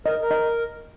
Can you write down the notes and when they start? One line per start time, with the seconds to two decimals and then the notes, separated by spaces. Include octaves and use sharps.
0.06 A#4 D#5
0.22 A#4
0.31 D#5